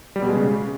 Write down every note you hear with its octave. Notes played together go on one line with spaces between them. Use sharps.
G3
B2
G#3
C#3